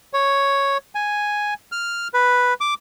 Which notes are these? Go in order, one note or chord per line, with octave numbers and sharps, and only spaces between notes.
C#5
G#5
F6
B4
D6